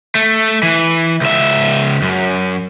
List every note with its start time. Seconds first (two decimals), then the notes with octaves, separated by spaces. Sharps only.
0.15 A3
0.63 E3
1.21 C#2 E5
2.02 F#2